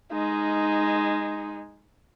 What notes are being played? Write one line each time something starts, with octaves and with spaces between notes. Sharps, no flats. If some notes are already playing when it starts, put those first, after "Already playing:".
G#3 D#4